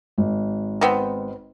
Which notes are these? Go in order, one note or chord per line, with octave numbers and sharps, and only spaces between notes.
G#1
D#3 B3 C4